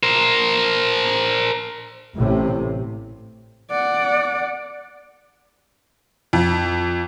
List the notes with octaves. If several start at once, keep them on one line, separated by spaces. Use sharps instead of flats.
A#4 C5
A1 A2 C3
D5 F#5
F2